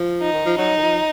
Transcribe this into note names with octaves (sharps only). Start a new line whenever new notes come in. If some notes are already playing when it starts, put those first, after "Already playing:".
Already playing: F3
D#4
D#3
F3
F#3 D#4
D#3
F3